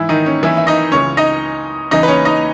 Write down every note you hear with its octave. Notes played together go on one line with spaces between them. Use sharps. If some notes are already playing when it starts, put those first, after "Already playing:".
Already playing: G#2 E3 E4
D#3 D#4
C#4
E3 E4
E5
D#4 D#5
C#2 C#3 E3 C#4 C#5
D#4 D#5
E2 C#3 E3 D#4 D#5
B4
C#4 C#5
D#4 D#5